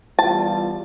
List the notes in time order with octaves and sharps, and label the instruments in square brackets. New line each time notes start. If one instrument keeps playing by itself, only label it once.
[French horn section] E2 G3 F4 [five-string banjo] A5